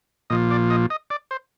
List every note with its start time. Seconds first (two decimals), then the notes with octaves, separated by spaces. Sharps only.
0.30 A#2 F3 D#5
0.51 D5
0.70 D#5
0.90 D#5
1.10 D5
1.31 C5